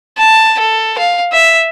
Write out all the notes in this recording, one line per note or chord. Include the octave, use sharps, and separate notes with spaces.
A5
A4
F5
E5